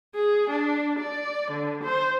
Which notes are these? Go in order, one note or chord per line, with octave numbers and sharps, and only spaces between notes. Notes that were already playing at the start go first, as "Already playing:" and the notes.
G#4
D4
D5
D3
C5